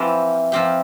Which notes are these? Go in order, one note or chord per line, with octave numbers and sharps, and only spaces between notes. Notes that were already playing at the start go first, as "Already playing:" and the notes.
Already playing: E3 F3 C4 G4
F3 C4 G4